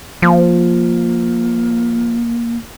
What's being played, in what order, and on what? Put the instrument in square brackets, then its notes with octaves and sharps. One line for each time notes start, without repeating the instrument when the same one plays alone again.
[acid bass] F3 [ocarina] A#3